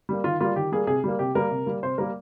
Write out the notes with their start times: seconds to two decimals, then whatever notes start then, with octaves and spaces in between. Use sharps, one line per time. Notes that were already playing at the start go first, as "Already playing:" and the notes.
0.09 G3 A#3
0.24 D#3 F4
0.40 G3 A#3 F4
0.56 D#3 G4
0.72 G3 A#3 G#4
0.87 C3 G#4
1.04 G3 A#3
1.19 C3 G4
1.35 G3 A#3 A#4
1.51 C3
1.66 G3 A#3
1.83 C3 C5
1.98 G3 A#3 A#4